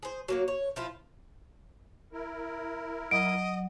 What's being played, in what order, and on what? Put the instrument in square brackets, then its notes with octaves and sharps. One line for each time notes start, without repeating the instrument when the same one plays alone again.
[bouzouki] G#4 C5
F#3 A#3 F#4
C#5
F3 E4 F4
[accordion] E4 A#4
[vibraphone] F#3 [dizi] D#5 [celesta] D7